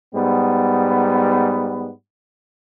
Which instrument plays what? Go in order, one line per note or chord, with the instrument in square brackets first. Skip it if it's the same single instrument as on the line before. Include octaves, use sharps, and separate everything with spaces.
[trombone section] G#2 G3 B3